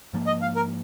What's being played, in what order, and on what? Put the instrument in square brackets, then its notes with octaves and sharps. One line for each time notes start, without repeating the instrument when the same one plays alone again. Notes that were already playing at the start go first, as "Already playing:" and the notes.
[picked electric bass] G#2 F3 A#3
[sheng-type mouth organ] D#5
F5
A#4